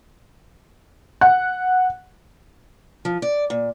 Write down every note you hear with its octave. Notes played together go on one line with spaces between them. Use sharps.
F#5
F3
D5
A#2